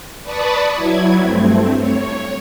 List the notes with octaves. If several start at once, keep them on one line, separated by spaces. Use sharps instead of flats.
B4 D5 A5 B5 C#6 D#6
F#3 E4 G#6
G2 A3 C4
C#5